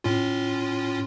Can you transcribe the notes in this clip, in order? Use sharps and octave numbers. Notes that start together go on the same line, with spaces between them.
A2 C#4 F4